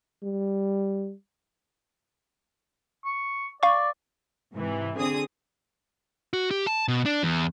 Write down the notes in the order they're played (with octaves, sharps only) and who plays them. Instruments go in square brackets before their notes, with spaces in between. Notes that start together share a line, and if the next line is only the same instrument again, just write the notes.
[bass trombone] G3
[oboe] C#6
[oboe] D5 [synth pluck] F5 C#6
[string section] G#2 C3 E3
D3 C4 G#4 D#6
[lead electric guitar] F#4
G4
A5
B2
D4
E2